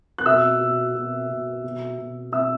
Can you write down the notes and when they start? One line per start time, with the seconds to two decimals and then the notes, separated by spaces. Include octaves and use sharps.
0.18 F#6
0.26 B2 E5 E6
0.61 B2
0.95 B2
1.29 B2
1.64 B2
1.98 B2
2.32 B2 E5 E6